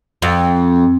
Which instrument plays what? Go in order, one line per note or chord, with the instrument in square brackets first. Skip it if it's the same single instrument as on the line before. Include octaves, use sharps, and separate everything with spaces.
[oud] F2